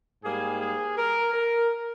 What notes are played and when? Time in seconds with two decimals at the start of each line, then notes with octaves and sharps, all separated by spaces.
0.24 G#2 G3 A#3 G#4
0.60 G#4
0.97 A#4
1.34 A#4